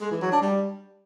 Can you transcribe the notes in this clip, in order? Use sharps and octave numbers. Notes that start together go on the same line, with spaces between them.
G#3
E3
F#3
D4
G3